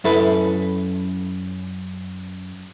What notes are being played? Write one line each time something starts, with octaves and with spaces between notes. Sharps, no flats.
F#2 E4 A4 B4